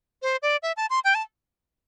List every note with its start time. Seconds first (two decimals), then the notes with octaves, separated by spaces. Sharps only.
0.22 C5
0.42 D5
0.63 E5
0.77 A5
0.90 C6
1.04 G5
1.15 A5